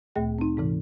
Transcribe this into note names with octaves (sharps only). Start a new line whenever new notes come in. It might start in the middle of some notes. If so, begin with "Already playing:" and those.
D2 A#2 A3 G#4 G5
C4 D#4
G#2 C3 E3